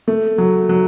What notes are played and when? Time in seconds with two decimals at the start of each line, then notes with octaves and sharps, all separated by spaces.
0.08 A3
0.38 F#3
0.69 F#3